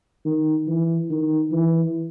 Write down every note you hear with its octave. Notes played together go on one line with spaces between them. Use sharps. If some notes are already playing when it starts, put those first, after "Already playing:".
D#3
E3
D#3
E3